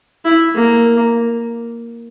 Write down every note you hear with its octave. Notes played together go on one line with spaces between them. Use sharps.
E4
A#3